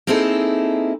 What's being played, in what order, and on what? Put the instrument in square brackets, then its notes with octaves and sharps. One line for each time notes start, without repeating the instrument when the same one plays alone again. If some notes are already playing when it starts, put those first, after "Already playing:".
[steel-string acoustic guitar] A#3 C4 D#4 E4 G#4 A4